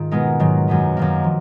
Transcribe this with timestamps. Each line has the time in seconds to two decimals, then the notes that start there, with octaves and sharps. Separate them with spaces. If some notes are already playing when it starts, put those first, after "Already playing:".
Already playing: G#2 D#3 F4
0.11 B2 G#3 B3 D#4 A#4
0.40 G#2 D#3 F#3
0.68 F#2 D#3 G#3 B3
0.97 F#2 D#3 A#3
1.24 F3